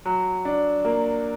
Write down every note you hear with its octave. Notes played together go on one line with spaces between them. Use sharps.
F#3
D4
A#3